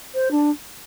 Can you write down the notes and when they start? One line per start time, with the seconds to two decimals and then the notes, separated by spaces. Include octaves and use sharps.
0.14 C5
0.31 D4